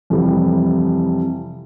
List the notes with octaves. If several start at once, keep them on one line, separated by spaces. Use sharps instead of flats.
F2 C3 E3 G3